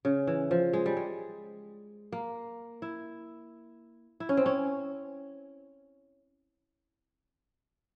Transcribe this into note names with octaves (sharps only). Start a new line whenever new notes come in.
C#3
E3
F3
G#3
G3
G#3
A#3
E4
E4
C#4
C4
C#4